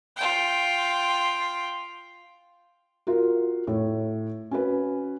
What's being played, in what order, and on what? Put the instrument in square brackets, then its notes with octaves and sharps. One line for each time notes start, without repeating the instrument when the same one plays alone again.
[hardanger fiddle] F4 G5
[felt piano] F4 F#4 A#4
A2 A3 C#5
C#4 F#4 B4